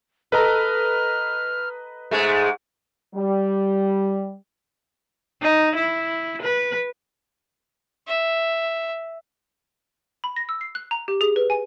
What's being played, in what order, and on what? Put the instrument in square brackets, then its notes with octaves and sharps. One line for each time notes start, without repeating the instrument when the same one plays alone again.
[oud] A4 [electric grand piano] B4 D#5 A#5 [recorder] F6
[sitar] G#2 G#3 A3
[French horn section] G3
[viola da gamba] D#4
E4
B4
[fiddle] E5
[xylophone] B5
A#6
E6
C7
F#6
A#5
G4
G#4
B4
G#5